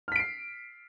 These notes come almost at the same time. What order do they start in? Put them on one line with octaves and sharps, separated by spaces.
F6 B6 D7 C7